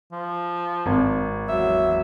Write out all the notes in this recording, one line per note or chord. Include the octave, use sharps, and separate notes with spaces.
F3
G#1
E2 F#3 E5